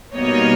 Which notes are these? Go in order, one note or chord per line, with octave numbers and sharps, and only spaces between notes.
B2 G3 A#3 D#4 C#5 D#5